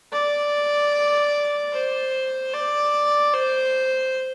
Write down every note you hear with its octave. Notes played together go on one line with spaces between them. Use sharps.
D5
C5
D5
C5